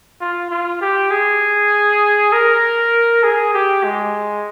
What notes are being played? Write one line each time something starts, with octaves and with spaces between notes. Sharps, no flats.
F4
F4
G4
G#4
A#4
G#4
G4
G#3